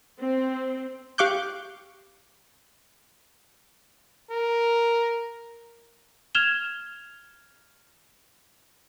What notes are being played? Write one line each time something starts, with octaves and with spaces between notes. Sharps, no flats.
C4
G4 F5 C#6 D6 F#6 G6
A#4
F6 G#6 E7 F7 G7